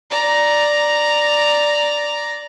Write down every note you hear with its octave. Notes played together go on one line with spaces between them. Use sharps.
D5 A#5